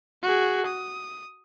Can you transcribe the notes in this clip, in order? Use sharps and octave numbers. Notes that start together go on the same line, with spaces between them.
F#4 G#4
D#6